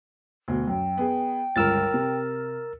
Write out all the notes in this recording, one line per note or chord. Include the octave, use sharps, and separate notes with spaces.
D2 B2
F#2 G5
B3 G#4
G1 C#2 A#4 E6 F6 A6
C3